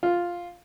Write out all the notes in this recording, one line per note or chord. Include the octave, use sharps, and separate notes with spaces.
F4